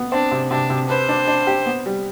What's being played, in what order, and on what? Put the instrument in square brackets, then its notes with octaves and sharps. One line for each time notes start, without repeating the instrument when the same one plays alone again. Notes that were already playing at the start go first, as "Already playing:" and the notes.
Already playing: [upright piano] B3
[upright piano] C4 [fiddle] D4
[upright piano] C3
[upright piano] C3 [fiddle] D4
[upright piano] C3
[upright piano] B4 [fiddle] C5
[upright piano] D4
D4
G4
B3
G3